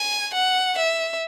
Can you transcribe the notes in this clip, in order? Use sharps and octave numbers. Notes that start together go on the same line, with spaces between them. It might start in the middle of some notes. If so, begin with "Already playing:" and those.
Already playing: G#5
F#5
E5